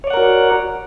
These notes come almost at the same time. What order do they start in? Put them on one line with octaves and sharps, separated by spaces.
C#5 D5 F#5 A#4 F#4